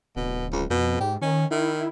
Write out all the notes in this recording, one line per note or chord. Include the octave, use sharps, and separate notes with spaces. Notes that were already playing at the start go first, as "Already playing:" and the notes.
D1 B2
C#2
F2 B2
G#2 G4
D#3 C#4
D#3 E4